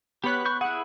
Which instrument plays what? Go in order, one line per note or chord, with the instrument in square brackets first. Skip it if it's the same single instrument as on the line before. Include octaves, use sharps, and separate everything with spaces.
[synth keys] B3 B5 F#6 [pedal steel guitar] G4 C#5
[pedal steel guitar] C#6 G6
[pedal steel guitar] E4 G#4 [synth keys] F#5